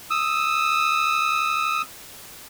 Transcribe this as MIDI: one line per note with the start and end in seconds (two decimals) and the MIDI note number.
0.10 1.82 87
0.10 1.82 88